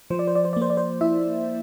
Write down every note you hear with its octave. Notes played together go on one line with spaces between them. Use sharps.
F3 C5
D5
C5
D5
C5
D5
A#3
C5
D5
C5
E4 E5